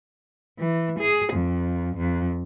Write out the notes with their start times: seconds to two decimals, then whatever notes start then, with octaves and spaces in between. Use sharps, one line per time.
0.59 E3
0.99 G#4
1.33 F2
1.97 F2